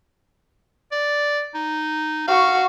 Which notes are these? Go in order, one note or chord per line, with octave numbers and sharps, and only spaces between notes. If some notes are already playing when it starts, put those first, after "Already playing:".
D5
D#4
F#4 F5 C#6